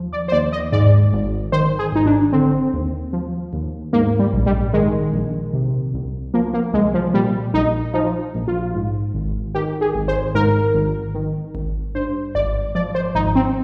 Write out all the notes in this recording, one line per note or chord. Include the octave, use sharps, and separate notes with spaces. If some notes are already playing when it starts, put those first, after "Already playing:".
Already playing: D#2 F3
D5
C5
D#2 D5
D#5
G#2 D5
G#1
D#3 C5
G#4
G#1 D#4
D4
D3 C4
D#2
F3
D#2
G#2 A#3
G3
A#1
G3
D#3 G#3
A#1
C3
C2
F3 A#3
A#3
C2 G#3
F3
A#2 G3
A#1 D#4
F3 D#4
A#1
F4
G#2
G#1
D#3 G4
G#4
G#1
C5
G#2 A#4
G#1
D#3
G#1
G2 C5
G#1 D5
F3 D5
C5
G#1 D#4
C4